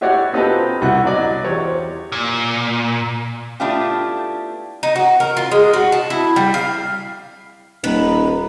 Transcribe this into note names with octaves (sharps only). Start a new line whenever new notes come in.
E4 F#4 G4 C#5 D5 F#5
C4 D#4 F4 G4 A4 B4
C2 E4 F#4 F#6
F#3 D5 D#5
E2 G4 C5 C#5
A#2
A3 B3 D4 E4 F4 G4
D#4
F#4
A#4
F4
G#3
F#4
A5
E4
G3
F5
D#1 D#4 B4